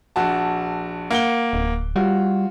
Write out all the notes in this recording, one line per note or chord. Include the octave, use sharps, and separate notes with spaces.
A#1 F#4 A5
A#3 F#5 G7
D1
G3 F4 F#4